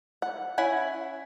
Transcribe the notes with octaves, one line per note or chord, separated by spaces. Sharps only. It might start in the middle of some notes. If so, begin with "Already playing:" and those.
F#5
C#4 E4 F#5 G#5